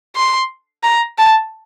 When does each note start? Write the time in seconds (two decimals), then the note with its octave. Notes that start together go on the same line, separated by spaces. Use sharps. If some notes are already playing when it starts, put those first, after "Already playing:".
0.16 C6
0.83 A#5
1.18 A5